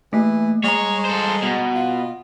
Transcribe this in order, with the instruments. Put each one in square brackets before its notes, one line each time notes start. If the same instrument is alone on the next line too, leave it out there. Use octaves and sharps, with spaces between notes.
[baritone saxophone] E3 [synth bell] A3 A#3
[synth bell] G3 A#5 [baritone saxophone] G#3 [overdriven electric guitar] C#5
[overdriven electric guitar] A4 C5
B2
[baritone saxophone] F4